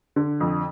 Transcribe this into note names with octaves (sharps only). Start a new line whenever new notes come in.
D3
F2